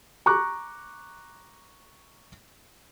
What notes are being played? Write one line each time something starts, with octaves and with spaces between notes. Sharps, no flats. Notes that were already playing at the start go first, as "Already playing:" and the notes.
A#5 C#6 D6 F#6